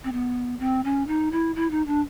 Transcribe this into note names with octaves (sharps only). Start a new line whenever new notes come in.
C4
B3
C4
C#4
D#4
E4
E4
D#4
D4